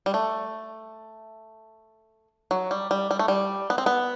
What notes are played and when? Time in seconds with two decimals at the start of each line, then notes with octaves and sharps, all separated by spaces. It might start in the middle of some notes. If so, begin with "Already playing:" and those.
0.06 G3
0.14 A3
2.51 F#3
2.71 G3
2.91 G3
3.11 G3
3.19 A3
3.28 G3
3.70 B3
3.78 C4
3.86 B3